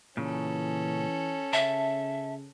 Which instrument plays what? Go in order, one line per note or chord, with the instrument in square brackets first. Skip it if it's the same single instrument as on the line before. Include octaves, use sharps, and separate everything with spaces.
[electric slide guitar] A#2 C#3 [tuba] E3 [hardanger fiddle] C#4 A4
[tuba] C#3 [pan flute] E5 [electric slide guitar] A5